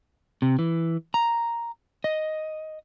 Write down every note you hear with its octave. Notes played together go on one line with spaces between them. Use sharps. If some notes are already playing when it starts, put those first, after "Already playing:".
C3
E3
A#5
D#5